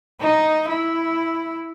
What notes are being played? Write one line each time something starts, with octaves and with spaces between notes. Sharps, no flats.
D#4
E4